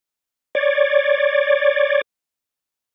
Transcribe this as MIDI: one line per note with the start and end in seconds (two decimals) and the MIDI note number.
0.55 2.01 73
0.55 2.01 74